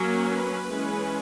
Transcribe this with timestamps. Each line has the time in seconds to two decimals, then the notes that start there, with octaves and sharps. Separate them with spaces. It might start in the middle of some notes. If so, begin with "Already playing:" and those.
Already playing: F#3 A#3 C#4
0.29 B4
0.69 E3 G#3 C#4